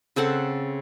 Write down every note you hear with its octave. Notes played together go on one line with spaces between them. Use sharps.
C#3 C4 A4 F#5